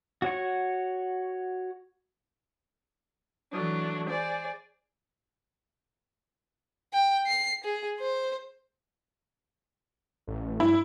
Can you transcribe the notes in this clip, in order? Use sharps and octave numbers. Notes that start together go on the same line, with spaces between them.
F#4 C#5 C#6
E3 F#3 A3 D4
G#4 C5 D5
G5
C7
G#4
C5
A1
G2 E4